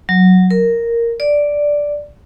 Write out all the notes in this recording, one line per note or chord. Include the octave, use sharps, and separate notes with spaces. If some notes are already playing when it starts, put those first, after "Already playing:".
F#3
A#4
D5